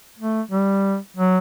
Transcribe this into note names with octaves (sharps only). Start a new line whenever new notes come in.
A3
G3
F#3